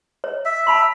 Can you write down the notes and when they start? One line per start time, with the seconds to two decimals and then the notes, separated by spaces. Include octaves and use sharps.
0.24 C#5
0.45 E5
0.67 A5 B5 C6